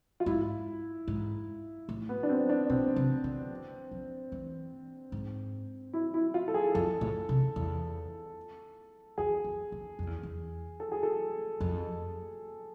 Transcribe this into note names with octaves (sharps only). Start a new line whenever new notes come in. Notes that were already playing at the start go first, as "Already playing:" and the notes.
F4
G#2 E4
G#2
A2
B3
D4
C4
D4
B2 C4
C3
D3
F3
E3
G#2
E4
E4
F4
A4
G#4
F2 A4
A2
C3
E2
E2 G#4
F2
F2
F2
E2
E2
A4
G#4
A4
F2